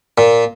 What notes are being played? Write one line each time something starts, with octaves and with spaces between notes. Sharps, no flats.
A#2